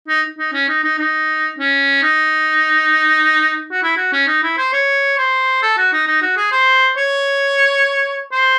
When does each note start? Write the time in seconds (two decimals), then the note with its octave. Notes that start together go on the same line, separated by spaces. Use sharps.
0.08 D#4
0.38 D#4
0.53 C#4
0.69 D#4
0.84 D#4
0.98 D#4
1.59 C#4
2.03 D#4
3.72 F#4
3.83 E4
3.97 F#4
4.13 C#4
4.27 D#4
4.43 E4
4.58 C5
4.73 C#5
5.18 C5
5.62 A4
5.78 F#4
5.93 D#4
6.07 D#4
6.22 F#4
6.37 G#4
6.52 C5
6.97 C#5
8.33 C5